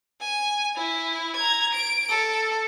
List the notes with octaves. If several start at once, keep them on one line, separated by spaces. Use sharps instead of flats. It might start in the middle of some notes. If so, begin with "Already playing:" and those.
G#5
E4
A#5 G#6
D7
A4